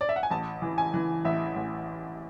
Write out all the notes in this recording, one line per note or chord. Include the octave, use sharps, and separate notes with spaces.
D5
E5
F#5
G#5
A1 A5
E3
G#5
E3
A1 E5
A1